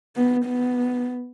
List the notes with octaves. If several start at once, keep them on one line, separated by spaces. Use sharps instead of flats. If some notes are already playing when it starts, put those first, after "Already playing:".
B3
B3